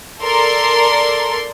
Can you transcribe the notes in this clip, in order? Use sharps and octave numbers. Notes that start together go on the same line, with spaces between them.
A4 A#4 D5 C6